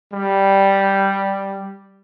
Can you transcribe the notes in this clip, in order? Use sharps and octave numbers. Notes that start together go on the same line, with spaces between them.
G3